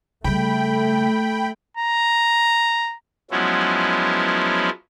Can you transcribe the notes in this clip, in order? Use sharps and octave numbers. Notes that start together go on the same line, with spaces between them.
C#3 G3 A3 G5 B5
A#5
F3 F#3 G#3 B3 C#4 E4